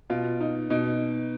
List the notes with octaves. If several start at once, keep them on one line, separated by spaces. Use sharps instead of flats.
B2 F4
D#4
B2 D#4